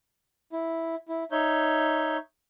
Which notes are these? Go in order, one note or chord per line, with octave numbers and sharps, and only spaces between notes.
E4
E4
D#4 C#5 E5 G6